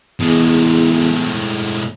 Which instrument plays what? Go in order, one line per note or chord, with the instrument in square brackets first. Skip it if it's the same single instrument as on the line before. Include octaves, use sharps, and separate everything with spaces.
[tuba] E2 [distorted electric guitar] A2 G#3